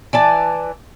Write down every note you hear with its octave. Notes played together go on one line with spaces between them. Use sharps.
E3 D5 A5